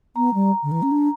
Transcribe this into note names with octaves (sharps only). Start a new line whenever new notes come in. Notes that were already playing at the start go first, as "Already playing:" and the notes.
B3 A#5
G3
D3
E3
C#4
D4